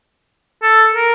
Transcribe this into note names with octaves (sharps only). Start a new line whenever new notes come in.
A4
A#4